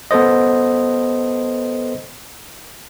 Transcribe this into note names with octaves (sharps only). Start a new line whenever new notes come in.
B3 A4 B4 C5 D#5